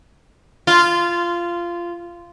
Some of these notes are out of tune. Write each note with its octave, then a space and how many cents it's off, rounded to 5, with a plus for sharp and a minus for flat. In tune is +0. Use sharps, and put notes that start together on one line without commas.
F4 -15